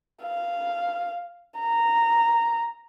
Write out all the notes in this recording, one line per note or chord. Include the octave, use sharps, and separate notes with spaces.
F5
A#5